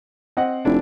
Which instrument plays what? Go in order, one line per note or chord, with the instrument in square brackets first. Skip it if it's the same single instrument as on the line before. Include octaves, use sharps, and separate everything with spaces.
[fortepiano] C4 D#5 F#5
[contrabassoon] F1 [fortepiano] D4 E4